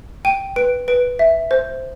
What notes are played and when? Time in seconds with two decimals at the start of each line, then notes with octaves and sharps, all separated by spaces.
0.25 G5 D#7
0.56 B4 D7
0.88 B4 D7
1.19 E5
1.51 C5